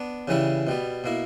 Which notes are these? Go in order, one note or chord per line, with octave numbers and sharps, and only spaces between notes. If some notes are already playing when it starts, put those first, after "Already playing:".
Already playing: B3 D4
C#3 E3 G3 C#4 E4
B2 G3 B3
B2 A#3 E4